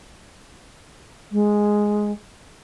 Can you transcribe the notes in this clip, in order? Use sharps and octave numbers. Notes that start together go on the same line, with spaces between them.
G#3